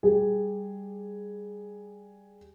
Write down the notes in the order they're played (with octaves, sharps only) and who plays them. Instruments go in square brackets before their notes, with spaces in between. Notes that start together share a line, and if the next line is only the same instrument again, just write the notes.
[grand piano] G3 G#4